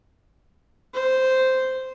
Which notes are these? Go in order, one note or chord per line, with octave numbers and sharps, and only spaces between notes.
C5